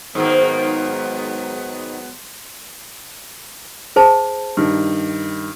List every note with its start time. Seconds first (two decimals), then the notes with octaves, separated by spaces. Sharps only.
0.15 G#2 D#3 F#3 G#3 A#3 B3 C5
3.96 G#4 C5 A5
4.57 G2 D#3